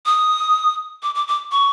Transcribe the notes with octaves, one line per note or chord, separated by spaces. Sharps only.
D#6
D6
D6
D6
C#6